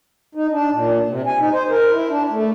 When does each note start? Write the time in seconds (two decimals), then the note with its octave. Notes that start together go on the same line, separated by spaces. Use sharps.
0.35 D#4
0.51 D4
0.72 A#2
1.08 C3
1.27 G#5
1.39 D#4
1.52 C5
1.70 A#4
1.92 E4
2.09 D4
2.30 A3